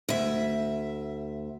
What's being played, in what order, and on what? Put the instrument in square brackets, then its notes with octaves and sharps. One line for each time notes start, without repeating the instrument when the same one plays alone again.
[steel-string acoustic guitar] D2 E5